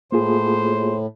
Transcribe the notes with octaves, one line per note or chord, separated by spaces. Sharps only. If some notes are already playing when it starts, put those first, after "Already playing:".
A2 A#3 F4 G#4 C5